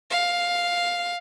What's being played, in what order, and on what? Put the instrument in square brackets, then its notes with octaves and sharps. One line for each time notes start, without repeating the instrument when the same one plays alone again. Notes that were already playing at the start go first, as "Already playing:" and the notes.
[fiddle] F5